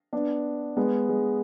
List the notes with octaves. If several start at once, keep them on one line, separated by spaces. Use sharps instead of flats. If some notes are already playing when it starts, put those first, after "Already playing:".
B3 D4
G#3 B3
G#3